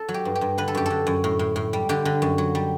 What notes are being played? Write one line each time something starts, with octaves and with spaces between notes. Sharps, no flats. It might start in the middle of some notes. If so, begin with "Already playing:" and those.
Already playing: A4
F#3
G4
G2
G4
G2
D3 B4
A4
F#2 G4
D3 A4
F#2
A2
A2
A2
G3
D3 G4
D3
F#2
F#3
G3